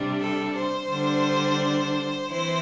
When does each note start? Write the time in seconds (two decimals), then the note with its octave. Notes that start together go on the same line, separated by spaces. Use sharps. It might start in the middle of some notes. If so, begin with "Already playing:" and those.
Already playing: C3 G3 D4
0.20 A4
0.55 C5
0.90 D3 G3 D4
2.30 E3 C4 E4 C5